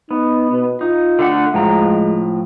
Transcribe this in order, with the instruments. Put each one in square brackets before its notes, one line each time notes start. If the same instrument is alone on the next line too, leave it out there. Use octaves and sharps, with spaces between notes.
[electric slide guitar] B3 [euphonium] D#4
[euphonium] B2
[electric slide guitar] D#4 [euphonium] F4
[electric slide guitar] D3 A3 F#5
[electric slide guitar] A2 F3 A#5 [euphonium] G#3